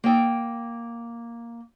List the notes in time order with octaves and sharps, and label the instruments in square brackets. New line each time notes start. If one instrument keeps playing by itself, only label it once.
[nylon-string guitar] A#3 G5